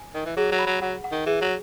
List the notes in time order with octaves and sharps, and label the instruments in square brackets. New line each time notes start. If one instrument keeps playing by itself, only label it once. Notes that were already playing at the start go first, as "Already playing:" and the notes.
Already playing: [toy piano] G#5
[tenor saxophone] D#3 [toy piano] D#5
[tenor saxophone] E3
[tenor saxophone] F#3 [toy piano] G#4
[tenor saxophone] F#3
[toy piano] B5
[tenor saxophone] F#3
[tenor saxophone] F#3 [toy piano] F#5
[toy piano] F#5
[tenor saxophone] D#3
[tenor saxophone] E3 [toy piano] G#4
[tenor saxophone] F#3